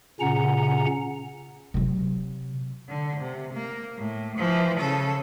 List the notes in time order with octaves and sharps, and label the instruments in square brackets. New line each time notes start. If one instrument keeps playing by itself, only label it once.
[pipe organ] A#2 C#3 C#4 F#5 A#5
[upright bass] C3 F#3
[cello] D3
C3
A#3
A2
E3 F3
C#3 A4